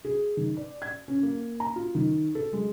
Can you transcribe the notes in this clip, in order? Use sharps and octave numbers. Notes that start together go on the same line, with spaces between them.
G#4
D#3
D5
G#6
C#4
A#3
A#5
F4
D#3
A4
G#3